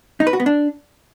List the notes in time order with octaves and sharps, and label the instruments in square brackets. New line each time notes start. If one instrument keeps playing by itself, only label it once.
[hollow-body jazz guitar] D#4
B4
F#4
B3
D4